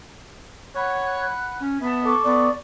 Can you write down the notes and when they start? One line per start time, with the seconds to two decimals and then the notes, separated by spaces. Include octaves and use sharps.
0.74 C#5 F#5 B5 F#6
1.60 C#4
1.81 B3 E5 A5
2.04 A4 C#6 D6
2.25 B3 D5